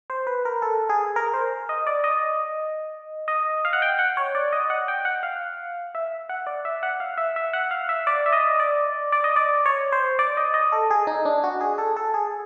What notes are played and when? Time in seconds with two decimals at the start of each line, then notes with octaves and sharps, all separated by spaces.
0.10 C5
0.27 B4
0.45 A#4
0.62 A4
0.89 G#4
1.16 A#4
1.33 C5
1.69 D#5
1.87 D5
2.04 D#5
3.28 D#5
3.65 F5
3.73 F#5
3.82 G5
3.99 F#5
4.17 C#5
4.35 D5
4.52 D#5
4.70 F#5
4.88 G5
5.05 F#5
5.23 F5
5.95 E5
6.29 F#5
6.47 D5
6.65 E5
6.83 F#5
7.00 F5
7.18 E5
7.36 E5
7.53 F#5
7.71 F5
7.89 E5
8.07 D5
8.26 E5
8.33 D#5
8.60 D5
9.12 D5
9.24 D#5
9.36 D5
9.66 C#5
9.92 C5
10.19 D5
10.37 D#5
10.54 D#5
10.72 A4
10.91 G#4
11.07 D#4
11.25 D4
11.44 F#4
11.61 G#4
11.78 A4
11.96 A4
12.14 G#4